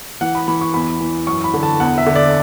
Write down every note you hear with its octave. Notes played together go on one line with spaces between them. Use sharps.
E3 F#5
B5
E3 B5
C#6
E2 B5
E3
F#2 C#6
B5
D3
A5
E2 F#5
E5
D3
D5